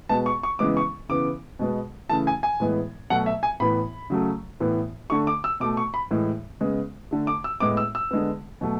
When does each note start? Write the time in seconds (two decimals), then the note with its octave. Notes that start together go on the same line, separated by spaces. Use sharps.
0.09 B2 G#3 B3 A5
0.26 C#6
0.43 C#6
0.59 C#3 E3 G#3 B3 D6
0.77 C#6
1.09 C#3 E3 B3 D6
1.59 B2 G#3 B3
2.09 C#3 E3 A3 A5
2.27 G#5
2.43 G#5
2.60 A2 E3 G#3 B3
3.10 B2 F#3 A3 F#5
3.26 E5
3.43 G#5
3.60 A2 E3 B3 B5
4.10 C#3 F#3 A3
4.60 A2 E3 B3
5.10 D3 A3 C#6
5.27 D6
5.44 E6
5.60 B2 A3 D6
5.77 C#6
5.94 B5
6.11 A2 E3 G#3
6.60 C#3 G#3 B3
7.11 D3 A3
7.27 D6
7.44 E6
7.60 A2 G#3 B3 D6
7.77 E6
7.95 E6
8.11 D3 G#3 B3
8.61 B2 F#3 A3